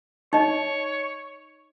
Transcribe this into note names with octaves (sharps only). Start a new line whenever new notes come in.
D#4 C#5 D#5